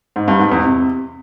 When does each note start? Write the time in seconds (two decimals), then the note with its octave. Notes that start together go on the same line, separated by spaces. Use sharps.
0.16 G#2
0.28 G2
0.40 G#2
0.52 E2
0.63 C3